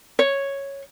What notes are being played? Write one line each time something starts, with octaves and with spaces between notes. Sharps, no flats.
C#5